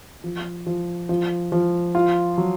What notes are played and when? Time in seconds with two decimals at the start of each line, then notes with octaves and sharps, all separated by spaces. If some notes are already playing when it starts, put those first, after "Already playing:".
0.24 F3
0.67 F3
1.09 F3
1.52 F3
1.95 F4
2.38 F#3